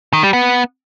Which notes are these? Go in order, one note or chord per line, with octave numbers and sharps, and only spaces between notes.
D#3
G3
B3